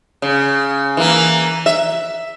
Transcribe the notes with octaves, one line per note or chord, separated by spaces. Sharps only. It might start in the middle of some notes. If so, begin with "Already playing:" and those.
C#3
E3 A#3
E5